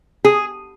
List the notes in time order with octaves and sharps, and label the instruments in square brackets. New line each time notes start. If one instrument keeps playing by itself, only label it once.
[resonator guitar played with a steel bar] G#4